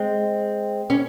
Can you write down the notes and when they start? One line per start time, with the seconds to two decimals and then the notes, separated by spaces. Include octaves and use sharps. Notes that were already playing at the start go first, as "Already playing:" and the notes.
Already playing: G#3 C4
0.90 C#4